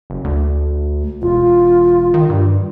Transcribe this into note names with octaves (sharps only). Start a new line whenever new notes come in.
F#1
D2
E1 F4
D#3
G2